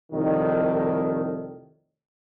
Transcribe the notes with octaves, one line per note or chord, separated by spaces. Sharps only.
C2 F2 A2 D#3